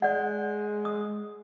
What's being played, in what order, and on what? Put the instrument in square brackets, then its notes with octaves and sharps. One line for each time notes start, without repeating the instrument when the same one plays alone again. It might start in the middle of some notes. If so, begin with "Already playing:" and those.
[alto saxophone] G#3 [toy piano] D5 F#5
[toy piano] D#6